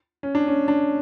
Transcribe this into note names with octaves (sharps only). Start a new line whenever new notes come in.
C#4
D4
C#4
D4